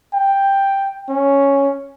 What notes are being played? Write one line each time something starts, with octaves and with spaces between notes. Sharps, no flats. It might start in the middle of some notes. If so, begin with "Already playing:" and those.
G5
C#4